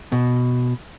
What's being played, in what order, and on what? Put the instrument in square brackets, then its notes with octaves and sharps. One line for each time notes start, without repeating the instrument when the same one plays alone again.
[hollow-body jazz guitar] B2